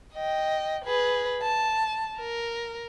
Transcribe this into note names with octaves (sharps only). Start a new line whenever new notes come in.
D#5 G5
G#4 B4
A5
A#4